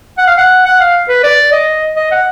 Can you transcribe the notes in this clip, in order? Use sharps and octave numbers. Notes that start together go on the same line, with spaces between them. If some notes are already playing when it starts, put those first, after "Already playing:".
F#5
F5
F#5
F#5
F5
B4
D5
D#5
D#5
F#5